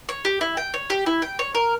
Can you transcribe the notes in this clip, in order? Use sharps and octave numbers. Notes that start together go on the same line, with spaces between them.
C#5
G4
E4
G5
C#5
G4
E4
G5
C#5
A#4